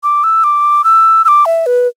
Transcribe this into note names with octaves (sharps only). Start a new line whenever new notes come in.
D6
E6
D6
E6
E6
D6
E5
B4